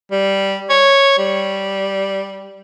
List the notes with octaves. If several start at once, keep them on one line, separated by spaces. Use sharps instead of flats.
G3
C#5
G3